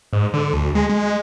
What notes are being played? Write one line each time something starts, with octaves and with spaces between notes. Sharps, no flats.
G#2
D3
D2
G#3
G#3